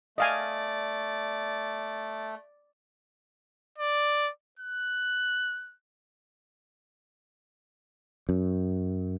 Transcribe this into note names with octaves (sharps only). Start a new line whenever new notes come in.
A3 D5 D#5 F5 G#5
D5
F#6
F#2